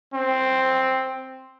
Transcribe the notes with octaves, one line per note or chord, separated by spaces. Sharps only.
C4